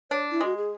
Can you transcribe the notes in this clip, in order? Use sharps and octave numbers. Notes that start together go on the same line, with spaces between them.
D4 C#5
E4
G#3 F#4
G#4